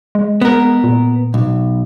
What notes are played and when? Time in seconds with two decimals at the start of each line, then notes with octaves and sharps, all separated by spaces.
0.15 G#3
0.41 B3 A#4
0.84 A#2
1.34 B1